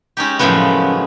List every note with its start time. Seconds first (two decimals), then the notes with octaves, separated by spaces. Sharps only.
0.17 G#3 C#4 D#4 G4
0.39 F#2 A2 C#3 F3 G#3 B3